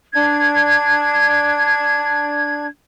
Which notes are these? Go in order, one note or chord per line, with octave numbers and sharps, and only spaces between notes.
D4 G#6